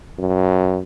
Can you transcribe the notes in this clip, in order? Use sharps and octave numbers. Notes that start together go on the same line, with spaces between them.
F#2